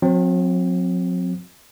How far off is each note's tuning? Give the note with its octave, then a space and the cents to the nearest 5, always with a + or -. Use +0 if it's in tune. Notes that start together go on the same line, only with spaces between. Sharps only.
F#3 -45 C4 +0